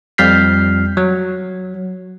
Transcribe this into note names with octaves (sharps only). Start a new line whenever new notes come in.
F2 G3 F6 G6 B6 C7
F#3